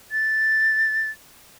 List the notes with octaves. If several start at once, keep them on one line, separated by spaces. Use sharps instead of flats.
A6